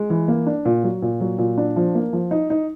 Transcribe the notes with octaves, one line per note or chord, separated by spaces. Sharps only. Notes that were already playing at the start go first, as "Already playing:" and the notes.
Already playing: G#3
E3
A#3
D4
A#2
F#3
A#2
F#3
A#2
D4
F3
A#3
F3
D#4
D#4